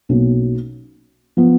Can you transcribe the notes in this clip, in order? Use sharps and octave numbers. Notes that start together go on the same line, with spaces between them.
B1 B2 A#3 C#4
F3 B3